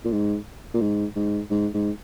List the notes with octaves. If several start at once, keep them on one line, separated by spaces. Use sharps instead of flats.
A#2
G#2
A#2
G#2
G#2
G#2
G#2